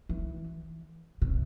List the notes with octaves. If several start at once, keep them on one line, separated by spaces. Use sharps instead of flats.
E3
C3